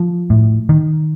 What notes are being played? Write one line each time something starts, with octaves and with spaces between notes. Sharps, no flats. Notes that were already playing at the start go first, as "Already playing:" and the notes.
Already playing: F3
A2
D#3